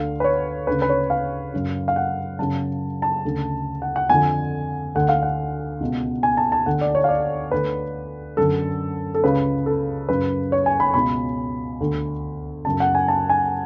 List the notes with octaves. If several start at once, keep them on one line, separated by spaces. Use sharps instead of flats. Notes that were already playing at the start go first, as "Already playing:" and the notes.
Already playing: D2 D3 F5
B4
C#5
D2 C#3 B4
B4
C#5
F5
F#2 C#3
F5
F#5
F#2 C#3 A5
A5
D2 C#3
F#5
F#5
F2 D3 G#5
D2 D3 F#5
F5
F#5
C#2 B2
G#5
A5
A5
D2 D3 F#5
D5
C#5
F5
D5
D2 D3 B4
F#2 D3 A4
A4
C#2 C#3 B4
A4
F#2 C#3 B4
C#5
G#5
B5
C#2 B2 B5
D2 D3
F#2 C#3 A5
F#5
G#5
A5
G#5